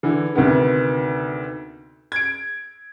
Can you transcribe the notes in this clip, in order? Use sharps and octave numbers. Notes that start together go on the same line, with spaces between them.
D3 E3
D2 C3 D#3 B3
G#6 D7